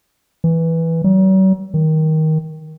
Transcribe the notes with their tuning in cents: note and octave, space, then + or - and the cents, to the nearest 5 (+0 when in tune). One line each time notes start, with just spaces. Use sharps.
E3 -5
F#3 +45
D#3 +15